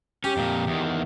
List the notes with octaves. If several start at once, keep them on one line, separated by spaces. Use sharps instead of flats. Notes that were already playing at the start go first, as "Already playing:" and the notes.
C#4 G4
F2 A#2
E2 D#3